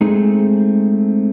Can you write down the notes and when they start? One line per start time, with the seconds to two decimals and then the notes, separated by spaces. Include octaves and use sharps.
0.01 G#3 A3 C4 D#4 G#4